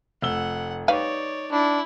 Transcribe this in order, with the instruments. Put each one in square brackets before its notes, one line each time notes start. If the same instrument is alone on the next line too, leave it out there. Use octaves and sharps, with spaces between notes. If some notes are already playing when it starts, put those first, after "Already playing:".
[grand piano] F1 E6 G7 [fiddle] F#5
[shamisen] G3 B4 F5 [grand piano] D#4 [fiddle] C#5 D5
[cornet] D4 [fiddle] E4